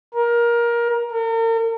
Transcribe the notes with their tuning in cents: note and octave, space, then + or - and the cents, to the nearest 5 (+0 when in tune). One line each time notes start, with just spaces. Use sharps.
A#4 +20
A#4 -40